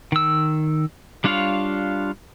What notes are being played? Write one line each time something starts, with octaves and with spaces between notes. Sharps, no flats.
D#3 E6
G3 D4 F4 C#5 F5